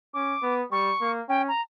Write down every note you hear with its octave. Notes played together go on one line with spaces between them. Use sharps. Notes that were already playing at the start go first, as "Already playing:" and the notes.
C#4 D6
B3
G3 C#6
A#3
C#4 G5
A#5